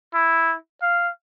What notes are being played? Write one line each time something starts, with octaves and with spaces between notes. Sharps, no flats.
E4
F5